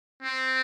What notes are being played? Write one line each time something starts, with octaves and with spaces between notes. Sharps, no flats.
C4